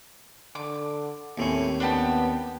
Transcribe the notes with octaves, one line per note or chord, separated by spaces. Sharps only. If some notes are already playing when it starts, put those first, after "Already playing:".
D3 D6
D#2 A2 C4 C#4
B3 D4 G4 A5